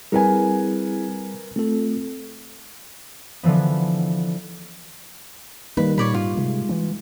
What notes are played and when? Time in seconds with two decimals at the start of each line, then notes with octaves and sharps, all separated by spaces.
0.12 G3 C4 E4 G#4 A#4 B4 G#5
1.56 A3 C4 F4 A4
3.43 D3 E3 F3 B3
5.77 D#3 G3 A#3 D#4 B4
5.98 A#2 C#5 D5 B5
6.14 G#2 F4
6.37 C3 G#3
6.69 E3